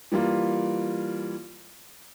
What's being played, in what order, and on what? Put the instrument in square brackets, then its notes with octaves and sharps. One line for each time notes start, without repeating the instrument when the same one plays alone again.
[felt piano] E3 G3 A#3 F4